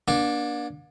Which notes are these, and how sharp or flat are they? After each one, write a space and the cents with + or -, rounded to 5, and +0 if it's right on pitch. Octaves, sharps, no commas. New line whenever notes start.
A#3 +45 D4 +0